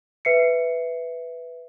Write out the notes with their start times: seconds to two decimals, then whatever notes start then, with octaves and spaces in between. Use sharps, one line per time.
0.25 B4 E5 C7 C#7